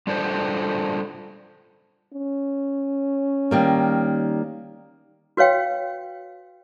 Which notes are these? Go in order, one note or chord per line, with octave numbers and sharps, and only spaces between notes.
G3 D4 F4 A4 B4 C5
C#4
D#3 G3 A#3
F#4 B4 C#5 F5 G5